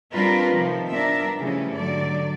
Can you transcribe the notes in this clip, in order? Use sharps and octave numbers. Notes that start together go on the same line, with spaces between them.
G3 C4 D4 F4 A#4 B4
C3 D#3 F3
G2 B3 D4 A#4 E5
C#3 E3 F3 G3 A3 C#4
G#2 D3 F#3 D5